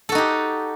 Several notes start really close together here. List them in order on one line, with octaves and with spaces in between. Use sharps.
A4 F#4 D#4 G4